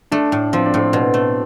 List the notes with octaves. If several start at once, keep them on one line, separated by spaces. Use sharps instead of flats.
A3 D4
A2
F3 C4
D4
A2 C4
B2
A3